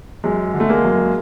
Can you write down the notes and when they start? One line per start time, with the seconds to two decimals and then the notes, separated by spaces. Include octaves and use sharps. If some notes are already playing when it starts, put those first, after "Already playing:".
0.24 F#2 G#3
0.54 D3
0.60 A3
0.69 G#3 A#3
0.84 F#2